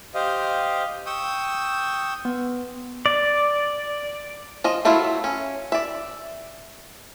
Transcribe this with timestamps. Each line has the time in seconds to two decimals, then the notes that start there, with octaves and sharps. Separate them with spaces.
0.14 G4 C5 D#5 F5
1.06 G5 C#6 D#6 E6 G6
2.25 B3
3.06 D5
4.64 F3 D#5
4.85 F#3 A3 E4 F4
5.24 C#4
5.72 D5 E5